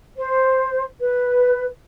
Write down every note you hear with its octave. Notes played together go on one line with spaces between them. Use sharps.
C5
B4